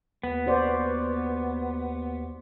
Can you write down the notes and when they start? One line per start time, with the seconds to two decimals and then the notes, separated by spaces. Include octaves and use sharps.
0.23 D#2 B3
0.47 F#4 C5 D5